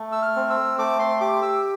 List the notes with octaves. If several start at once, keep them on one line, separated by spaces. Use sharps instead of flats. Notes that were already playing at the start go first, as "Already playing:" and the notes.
Already playing: A3
E6
F6
C4
E6
A3 D6
C6
G4 D6
E6